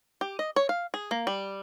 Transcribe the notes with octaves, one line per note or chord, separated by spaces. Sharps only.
G4
D#5
C#5
F5
G#4
A#3
G3